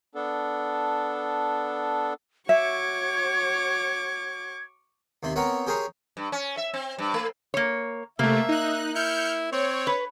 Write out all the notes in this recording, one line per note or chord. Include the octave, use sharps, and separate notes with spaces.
B3 D4 A4
F#4 C#5 E5 C#6 D6 G#6
D#2 C3 B5 C6
B3 C4 A#4 C#5 F#5 B5
G4 G#4 A#4 C5 C#5
G2
C#4
E5
C4
G2
A3
A#3 C#5
C3 A3 A#3 E5
D#4 F#6
E4 F6 G6 C#7
C4 C#5
B4